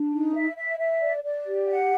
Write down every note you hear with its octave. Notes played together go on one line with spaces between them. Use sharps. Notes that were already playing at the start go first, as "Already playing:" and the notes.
Already playing: D4
D#4
E5
E5
E5
D5
D5
G4
F#5